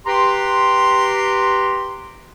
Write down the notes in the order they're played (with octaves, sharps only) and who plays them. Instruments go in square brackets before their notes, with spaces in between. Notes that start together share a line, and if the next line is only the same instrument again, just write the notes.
[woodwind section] G4 B4 A#5 C6